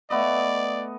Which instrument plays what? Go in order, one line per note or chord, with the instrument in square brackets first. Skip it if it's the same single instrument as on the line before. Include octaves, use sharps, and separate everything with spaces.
[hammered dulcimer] A3 B3 D#5 [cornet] D5